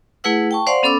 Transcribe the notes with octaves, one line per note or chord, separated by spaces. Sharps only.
A3 E4 G#4 B4 F#5 E6
G5 A5 C#6
C5 D5 F5 F#5 C6
B3 C#4 A4 B5 D6 E6